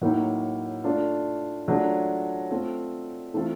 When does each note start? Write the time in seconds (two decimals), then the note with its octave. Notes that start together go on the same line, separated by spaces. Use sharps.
0.01 A2 F#3 A#3 D#4
0.84 A3 D4 F4
1.68 F#3 A3 D4 F4 G#4
2.50 A3 C4 F4
3.34 E3 A3 C4 F4 A4